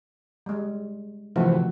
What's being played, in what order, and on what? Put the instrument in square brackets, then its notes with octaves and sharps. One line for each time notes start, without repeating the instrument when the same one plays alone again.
[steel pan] G3 G#3
[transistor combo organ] C3 E3 [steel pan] F3 A3 F#4